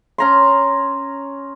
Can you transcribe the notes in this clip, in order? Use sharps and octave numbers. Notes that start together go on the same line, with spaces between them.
C#4 A#5 C6